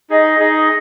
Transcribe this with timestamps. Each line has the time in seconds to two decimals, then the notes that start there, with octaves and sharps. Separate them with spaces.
0.10 D#4 G#4 D#5
0.39 D#4 G#4 D#5